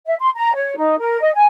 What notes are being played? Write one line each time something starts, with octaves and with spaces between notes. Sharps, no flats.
E5
C6
A#5
C#5
D#4
A#4
D#5
G#5